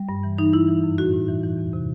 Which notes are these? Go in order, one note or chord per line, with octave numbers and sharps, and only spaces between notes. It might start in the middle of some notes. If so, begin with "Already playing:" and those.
Already playing: G3
G2
E3
E3 D#4
E3 E4
E3
F#2
A2 F#4
A2
E3
E3
E2
C3